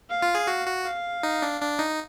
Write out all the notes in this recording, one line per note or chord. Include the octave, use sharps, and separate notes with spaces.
F5
F4
G#4
F#4
F#4
F5
D#4
D4
D4
D#4